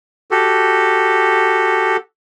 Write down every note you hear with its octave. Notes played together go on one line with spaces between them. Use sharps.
F#4 G4 A4